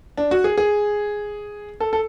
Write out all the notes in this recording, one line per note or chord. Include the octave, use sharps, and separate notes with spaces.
D4
F#4
G#4
G#4
A4
A4